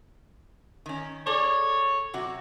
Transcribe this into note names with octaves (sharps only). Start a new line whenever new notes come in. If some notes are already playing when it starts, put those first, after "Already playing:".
D#3 C#4
G#4 A4 C#5 D5
C3 F#3 F#4